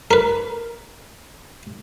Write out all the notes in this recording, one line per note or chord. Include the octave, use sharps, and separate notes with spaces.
A#4 B4